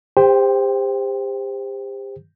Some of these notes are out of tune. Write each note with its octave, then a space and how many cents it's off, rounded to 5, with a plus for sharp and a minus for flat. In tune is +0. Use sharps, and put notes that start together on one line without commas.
G4 +35 C5 +0 G5 +0